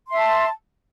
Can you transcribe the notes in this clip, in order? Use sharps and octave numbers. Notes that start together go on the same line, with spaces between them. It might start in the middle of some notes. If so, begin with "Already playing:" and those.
E5 A5 C6